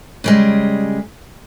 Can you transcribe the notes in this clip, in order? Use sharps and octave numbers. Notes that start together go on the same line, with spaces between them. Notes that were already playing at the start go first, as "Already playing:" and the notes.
C#3 G3 G#3